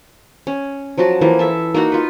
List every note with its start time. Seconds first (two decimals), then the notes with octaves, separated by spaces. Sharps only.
0.47 C#4
0.98 F3 F#3 F#4 A5
1.21 E3 F3 A#3
1.39 A4 E5 A5
1.74 A#3 D#4 F#4 F#5
1.92 F4 B4